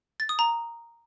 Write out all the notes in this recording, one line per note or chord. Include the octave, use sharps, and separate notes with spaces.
A6
D#6
A#5